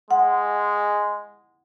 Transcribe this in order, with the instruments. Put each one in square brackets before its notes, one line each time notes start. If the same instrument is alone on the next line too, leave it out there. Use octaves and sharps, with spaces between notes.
[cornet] G#3 [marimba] F#5